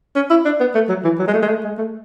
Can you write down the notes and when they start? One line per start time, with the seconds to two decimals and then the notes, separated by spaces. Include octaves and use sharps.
0.16 C#4
0.30 E4
0.45 D4
0.60 B3
0.74 A3
0.89 F#3
1.04 E3
1.19 F#3
1.27 G#3
1.34 A3
1.42 G#3
1.48 A3
1.64 G#3
1.78 A3